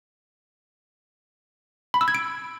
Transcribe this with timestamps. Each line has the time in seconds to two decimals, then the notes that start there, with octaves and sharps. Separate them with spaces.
1.94 B5
2.01 E6
2.08 G#6
2.15 D7